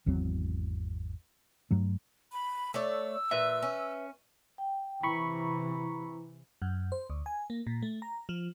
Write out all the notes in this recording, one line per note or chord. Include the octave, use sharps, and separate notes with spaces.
G#1 E2 F#3 C4
G2 F#3 A3
B5
A3 C#5 D5 E6
A#2 B4 E5
C#4
G5
C3 E3 E4 A#5 B5 C#6
F#2
C5
D2
G#5
A#3
A#2
A3
A#5
F3